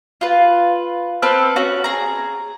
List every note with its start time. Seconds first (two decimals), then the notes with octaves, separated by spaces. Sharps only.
0.21 F4 B4
1.22 C4 A4 B4 F6
1.56 C#4 F#4
1.84 G#4 A#5